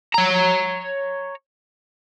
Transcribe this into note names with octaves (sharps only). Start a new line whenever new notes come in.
C#5 A#5